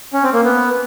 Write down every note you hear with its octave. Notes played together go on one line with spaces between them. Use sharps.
C#4
C4
A#3
B3